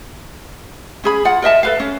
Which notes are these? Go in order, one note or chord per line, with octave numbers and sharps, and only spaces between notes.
C#4 G#4 B5
F4 F#5
A#4 D#5 E5 A5
A4 B4 F5
C#4